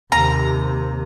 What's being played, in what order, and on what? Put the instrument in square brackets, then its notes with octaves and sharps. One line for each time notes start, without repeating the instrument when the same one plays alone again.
[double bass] D#2 C3 [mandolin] A#5